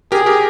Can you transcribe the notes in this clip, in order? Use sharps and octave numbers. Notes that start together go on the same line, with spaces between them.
G4 G#4 A#4
G4 A#4